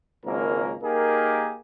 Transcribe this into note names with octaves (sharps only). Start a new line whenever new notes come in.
G#1 C#2 A#3 C#4 A#4
A#3 D#4 G4 G#4 A#4